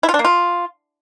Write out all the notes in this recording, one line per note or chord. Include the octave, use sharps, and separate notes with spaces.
E4
F4
D4
A#3
F4